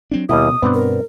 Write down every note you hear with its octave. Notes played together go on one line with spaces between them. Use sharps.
F#3 C4 D4
D#2 B2 G3 E4 D#6
G2 B2 B3 C4 D4
A#4